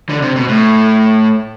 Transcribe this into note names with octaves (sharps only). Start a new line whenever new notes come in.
D3
C3
B2
A2